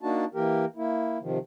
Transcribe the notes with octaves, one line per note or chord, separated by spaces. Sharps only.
A#3 D4 D#4 F#4 A5
E3 A#3 G4 A#4
A#3 E4
C3 D#3 F3